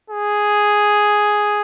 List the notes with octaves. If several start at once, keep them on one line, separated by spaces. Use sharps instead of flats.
G#4